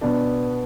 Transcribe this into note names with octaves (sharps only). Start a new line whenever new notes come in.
B2 B3 D4